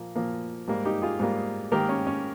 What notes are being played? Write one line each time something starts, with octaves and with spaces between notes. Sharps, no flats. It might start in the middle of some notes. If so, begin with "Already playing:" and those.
Already playing: A#2 F3 A#3
A#2 F3 A#3
G#2 G3 A#3
D#4 G4
F4 G#4
G#2 G3 A#3
G#2 D#3 A#3 G4 A#4
C#4
C#4